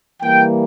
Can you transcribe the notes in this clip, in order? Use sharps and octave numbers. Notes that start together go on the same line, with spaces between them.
E3 G3 A#3 G5